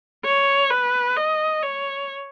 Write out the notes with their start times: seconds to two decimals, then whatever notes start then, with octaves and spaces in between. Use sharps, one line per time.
0.25 C#5
0.71 B4
1.17 D#5
1.63 C#5